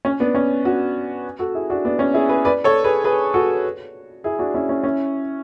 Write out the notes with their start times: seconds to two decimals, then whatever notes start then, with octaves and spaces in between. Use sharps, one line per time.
0.05 C#4
0.20 B3 D4
0.35 C#4
0.64 D4 F#4
1.39 F#4 A4
1.54 E4 G#4
1.70 D4 F#4
1.85 B3 D4
1.99 C#4
2.14 E4 G#4
2.29 G#4 B4
2.45 B4 D5
2.64 A4 C#5
2.84 G#4 B4
3.04 G#4 B4
3.34 F#4 A4
4.24 E4 G#4
4.39 D4 F#4
4.54 C#4 E4
4.69 C#4
4.84 C#4 E4